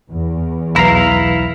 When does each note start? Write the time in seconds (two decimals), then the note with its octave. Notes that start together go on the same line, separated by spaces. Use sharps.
0.11 E2
0.76 B1 E4 B4 F5 A#5